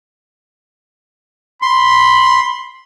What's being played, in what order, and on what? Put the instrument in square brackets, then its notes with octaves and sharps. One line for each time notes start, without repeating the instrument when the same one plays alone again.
[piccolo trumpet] B5 [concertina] C6